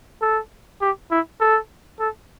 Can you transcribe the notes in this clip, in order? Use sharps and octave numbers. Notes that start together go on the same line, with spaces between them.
A4
G4
E4
A4
A4